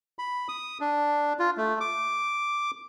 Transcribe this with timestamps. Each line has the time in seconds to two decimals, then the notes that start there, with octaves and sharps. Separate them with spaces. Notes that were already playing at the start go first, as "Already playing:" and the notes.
0.19 B5
0.48 D#6
0.81 D4
1.39 F4
1.57 A3
1.81 D6